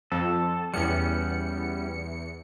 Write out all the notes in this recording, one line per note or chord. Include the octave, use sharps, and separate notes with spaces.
F2 A4
E2 G3 B3 C#4 C#7